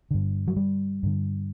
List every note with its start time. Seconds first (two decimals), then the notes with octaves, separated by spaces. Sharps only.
0.11 G2 D3
0.48 F#3
0.56 G3
1.03 G2 D3